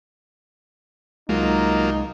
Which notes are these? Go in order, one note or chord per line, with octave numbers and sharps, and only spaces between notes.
C2 F#3 G#3 A#3 D#4 F4